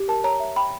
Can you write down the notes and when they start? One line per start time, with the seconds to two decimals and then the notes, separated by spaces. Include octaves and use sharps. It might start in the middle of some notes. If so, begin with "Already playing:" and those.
Already playing: G4
0.08 A#4 A5
0.24 C#5 A#5
0.40 E5
0.56 G5 B5